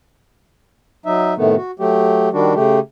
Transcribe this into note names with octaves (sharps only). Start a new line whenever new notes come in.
F#3 D#4 E5
A2 C3 D#3 A3 B3
F#4
F#3 A3 G4
D#3 G3 D4 F#4
C#3 A3 G4